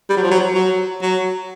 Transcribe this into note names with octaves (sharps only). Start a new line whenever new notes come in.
G3
F#3
F3
F#3
F#3
F#3